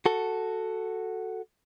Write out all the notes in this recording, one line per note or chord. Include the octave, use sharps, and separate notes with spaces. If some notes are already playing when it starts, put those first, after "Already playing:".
F#4 A4